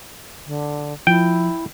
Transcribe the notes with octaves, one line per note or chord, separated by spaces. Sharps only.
D3
F3 E4 G5